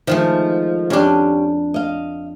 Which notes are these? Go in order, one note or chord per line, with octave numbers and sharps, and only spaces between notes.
D#3 F3 G#3 A3
F2 C#4 D4 G4
D#5 F5